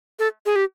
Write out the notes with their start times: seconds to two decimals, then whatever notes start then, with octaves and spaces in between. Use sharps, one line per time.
0.19 A4
0.46 G#4
0.56 G4